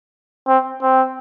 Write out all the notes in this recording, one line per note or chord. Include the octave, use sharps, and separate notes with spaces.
C4
C4